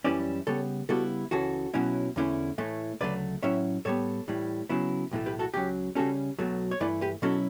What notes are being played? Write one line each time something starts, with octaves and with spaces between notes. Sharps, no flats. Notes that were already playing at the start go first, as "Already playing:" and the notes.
F#2 E3 G3 C#4 E4 B4 D5
C#3 G3 B3 A4 C#5
C#3 G3 B3 E4 F#4 A4
C#2 C#3 E3 F#4 A4
B1 B2 F#3 C#4 E4
E2 D3 A3 C#4 E4
A2 E3 A3
D2 C#3 F#3 A3 B4 D5
A2 F#3 C#4 E4 C#5 E5
A2 G3 B3 A4 C#5
A2 E3 G3
C#3 F#3 B3 E4
B1 A2 E3 A3
G4 B4
F#4 A4
C#2 C#3 F#3 G4
C#3 G3 C#4 F#4 A4
B1 B2 F#3 A3
C#5
G2 E3 A3 E4 B4 D5
G4 B4
B2 F#3 C#4 E4 F#4 A4